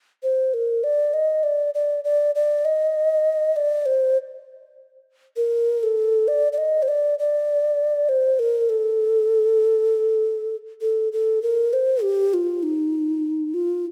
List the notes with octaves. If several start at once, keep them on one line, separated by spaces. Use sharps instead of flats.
C5
A#4
D5
D#5
D5
D5
D5
D5
D#5
D5
C5
A#4
A4
D5
D5
D#5
C5
D5
D5
C5
A#4
A4
A4
A4
A#4
C5
G4
F4
D#4
F4